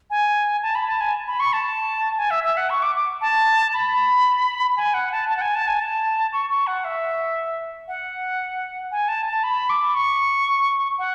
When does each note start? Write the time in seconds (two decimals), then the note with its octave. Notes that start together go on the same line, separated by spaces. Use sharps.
0.10 G#5
0.63 A5
0.75 B5
0.88 A5
1.01 G#5
1.27 B5
1.40 C#6
1.53 A5
2.18 G#5
2.31 E5
2.44 E5
2.57 F#5
2.70 C#6
2.82 D6
2.96 D6
3.21 A5
3.74 B5
4.77 G#5
4.94 F#5
5.12 A5
5.29 A5
5.37 F#5
5.41 G#5
5.55 A5
5.68 G#5
5.80 A5
6.33 C#6
6.50 C#6
6.67 F#5
6.85 E5
7.88 F#5
8.92 G#5
9.08 A5
9.26 A5
9.44 B5
9.70 D6
9.95 C#6
10.99 F#5